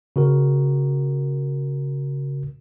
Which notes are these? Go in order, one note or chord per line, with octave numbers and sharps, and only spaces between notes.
C#3 F#4 A#4